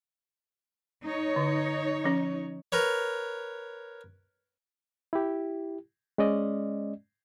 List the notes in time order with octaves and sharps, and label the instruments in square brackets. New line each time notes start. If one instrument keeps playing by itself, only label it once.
[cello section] D#4 C#5
[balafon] D3
F3 C#4
[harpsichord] A#4 B4 C#5
[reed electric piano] E4 G4
G#3 C#4 D5 D#5